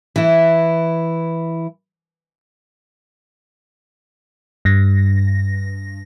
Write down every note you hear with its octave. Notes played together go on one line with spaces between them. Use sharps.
E3 E4
G2 A#6